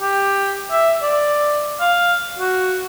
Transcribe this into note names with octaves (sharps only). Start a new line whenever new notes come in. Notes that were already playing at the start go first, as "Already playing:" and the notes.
G4
E5
D5
F5
F#4